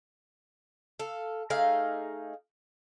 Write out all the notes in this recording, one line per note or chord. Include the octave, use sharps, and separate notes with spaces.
A4 F5
A3 D#4 G#4 F5